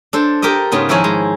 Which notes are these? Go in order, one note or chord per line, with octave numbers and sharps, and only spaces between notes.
D4 A4 C5
G4 A4 A#4 D#5
G#2 C#3 B3 D#4 F4
D#3 F3 E4 A#4 C#5 G#5
G#3